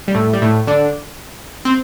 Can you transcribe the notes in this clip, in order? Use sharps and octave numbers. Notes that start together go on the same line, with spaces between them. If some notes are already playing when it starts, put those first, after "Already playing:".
G3
A2 A3
G3
A2 A3
D3 D4
C4